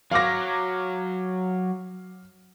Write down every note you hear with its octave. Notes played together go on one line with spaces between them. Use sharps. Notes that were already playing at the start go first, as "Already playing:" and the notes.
F#3 F5 D6 A#6